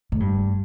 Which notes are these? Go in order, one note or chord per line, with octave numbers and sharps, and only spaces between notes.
A2
G2